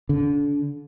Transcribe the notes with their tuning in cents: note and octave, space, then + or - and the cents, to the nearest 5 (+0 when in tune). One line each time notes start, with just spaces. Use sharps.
D3 -30